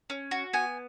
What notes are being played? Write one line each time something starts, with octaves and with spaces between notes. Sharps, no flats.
C#4
F#4
B3 G#5